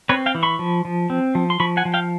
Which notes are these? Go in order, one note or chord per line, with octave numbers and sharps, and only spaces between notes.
C4 B4 C#5
F5 G5
E3
B5 C#6
F3
F3
C4
F3
C6
F3 B5 C#6
F#5 G#5
F3
F5 G5